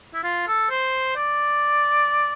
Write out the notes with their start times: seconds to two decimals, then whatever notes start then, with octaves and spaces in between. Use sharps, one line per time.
0.14 E4
0.23 F4
0.48 A4
0.70 C5
1.16 D5